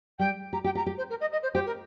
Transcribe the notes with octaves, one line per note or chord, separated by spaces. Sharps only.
G3 G5
G4 A#5
G4 G5
G4 A#5
G4
C5
A#4
D#5
D#5
C5
G4 C5
A#4